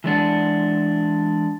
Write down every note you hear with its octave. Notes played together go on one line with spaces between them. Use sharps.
E3 G#3 D4 F#5